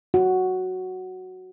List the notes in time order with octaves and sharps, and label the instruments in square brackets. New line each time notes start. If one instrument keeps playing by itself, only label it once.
[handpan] F#4